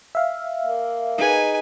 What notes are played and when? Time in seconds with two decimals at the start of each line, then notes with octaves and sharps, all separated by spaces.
0.15 E5 F5
0.65 A#3
1.18 D#4 G#4 B4 G#5